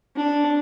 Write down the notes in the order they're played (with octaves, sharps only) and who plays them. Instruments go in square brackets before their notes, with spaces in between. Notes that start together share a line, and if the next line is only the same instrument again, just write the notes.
[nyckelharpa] D4